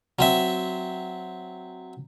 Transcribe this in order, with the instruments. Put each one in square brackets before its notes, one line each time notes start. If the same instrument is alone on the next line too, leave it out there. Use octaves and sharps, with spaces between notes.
[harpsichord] F#3 C4 E5